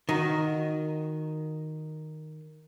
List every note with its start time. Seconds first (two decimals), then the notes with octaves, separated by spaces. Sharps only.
0.09 D#3 D#4 F#4